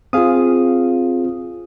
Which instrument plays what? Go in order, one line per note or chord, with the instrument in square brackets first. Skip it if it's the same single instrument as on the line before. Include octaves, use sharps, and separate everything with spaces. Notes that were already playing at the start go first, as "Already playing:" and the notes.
[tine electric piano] C4 F4 [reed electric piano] G#4 F5 D#6